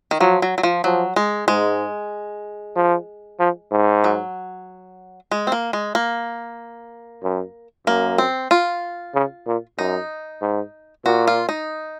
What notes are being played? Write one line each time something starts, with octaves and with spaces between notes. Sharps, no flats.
D#3
F3 F#3
F#3
F#3
F3
F3 F#3
G#3
G#2 G#3
F3
F3
G#2
F#3
G#3
C4
A#3
G#3
A#3
F#2
F#2 A#3
C4
F4
C#3
A#2
F#2 D#4
G#2
A#2 F#4
F4
D#4